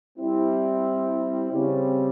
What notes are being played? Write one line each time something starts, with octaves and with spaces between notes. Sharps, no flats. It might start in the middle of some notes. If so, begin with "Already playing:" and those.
G3 C4 E4
C#3 G3 C4